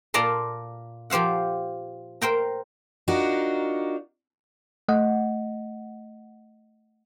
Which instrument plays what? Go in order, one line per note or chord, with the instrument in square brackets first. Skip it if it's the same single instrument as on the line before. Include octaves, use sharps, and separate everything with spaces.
[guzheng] A#2 F4 D5 A5 A#5 C6
F3 G4 C5 F5 F#5
A#4 C5 G5 A#5
[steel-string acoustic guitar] D4 D#4 F4 F#4 A#4
[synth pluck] A3 D#5 F#5